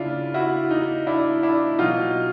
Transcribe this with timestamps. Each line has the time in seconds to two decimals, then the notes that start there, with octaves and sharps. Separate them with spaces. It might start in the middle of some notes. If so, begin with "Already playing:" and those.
Already playing: C#3 D4 E4 F4
0.34 E4 F#4
0.70 D#4
1.07 D4 E4
1.43 D4 E4
1.79 B2 F#3 D#4 F4